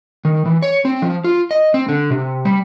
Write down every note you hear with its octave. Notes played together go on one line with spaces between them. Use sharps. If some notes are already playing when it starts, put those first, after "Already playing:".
D#3
E3
C#5
C4
F3
F4
D#5
C4
D3
C3
G3